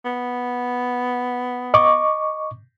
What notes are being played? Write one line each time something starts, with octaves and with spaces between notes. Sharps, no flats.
B3
D#5 C#6 D6